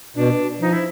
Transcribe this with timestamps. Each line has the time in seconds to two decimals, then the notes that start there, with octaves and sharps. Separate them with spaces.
0.16 B2 D4
0.60 F3 D#4
0.73 E4